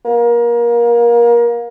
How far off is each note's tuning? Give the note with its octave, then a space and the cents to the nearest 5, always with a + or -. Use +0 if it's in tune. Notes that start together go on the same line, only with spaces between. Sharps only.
A#3 +25